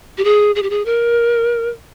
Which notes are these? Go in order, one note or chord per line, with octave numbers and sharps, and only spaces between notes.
G4
G#4
G#4
G4
G#4
A#4